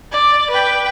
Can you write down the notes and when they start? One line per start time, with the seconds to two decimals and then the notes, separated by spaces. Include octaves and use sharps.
0.12 D5
0.50 B4 G5